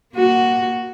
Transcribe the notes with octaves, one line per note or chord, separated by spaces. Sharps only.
A#3 F#4